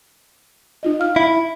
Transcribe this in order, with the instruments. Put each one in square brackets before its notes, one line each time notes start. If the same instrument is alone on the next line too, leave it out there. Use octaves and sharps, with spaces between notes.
[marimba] D#4 F4 D#5
F5 F6
[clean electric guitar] E4